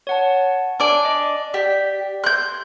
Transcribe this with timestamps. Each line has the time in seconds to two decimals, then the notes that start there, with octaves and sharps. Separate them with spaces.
0.07 C#5 F#5 A5
0.80 D4 D5 G#5
1.05 D#5
1.54 G4 D5 B6
2.24 C6 F#6 G6